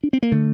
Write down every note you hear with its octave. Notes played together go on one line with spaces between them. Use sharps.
D4
C4
A#3
D3 A3